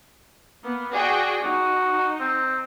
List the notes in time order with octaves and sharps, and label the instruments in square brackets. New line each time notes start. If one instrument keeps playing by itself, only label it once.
[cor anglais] A#3 [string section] B3
[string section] F#4 G#4 G5 [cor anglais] D5
[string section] D#4 [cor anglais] F#4
[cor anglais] C4